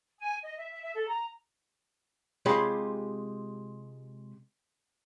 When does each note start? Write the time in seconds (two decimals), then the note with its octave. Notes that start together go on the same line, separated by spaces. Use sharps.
0.18 G#5
0.42 D#5
0.56 E5
0.70 E5
0.82 E5
0.94 A4
1.07 A#5
2.46 C3 G#3 F4 G4 C#5 B5